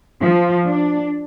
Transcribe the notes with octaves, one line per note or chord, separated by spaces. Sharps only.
F3
D4